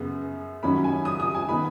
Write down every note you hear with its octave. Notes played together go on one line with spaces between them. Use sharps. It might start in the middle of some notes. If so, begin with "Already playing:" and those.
Already playing: F#2 C#3 B3
F#2 D#3 F#3 C#4 B5
G#5
D#6
D#6
G#5
D#3 B3 B5